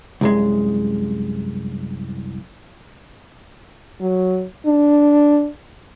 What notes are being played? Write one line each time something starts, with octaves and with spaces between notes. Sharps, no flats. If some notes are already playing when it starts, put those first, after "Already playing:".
C2 F#2 G#3
F#3
D4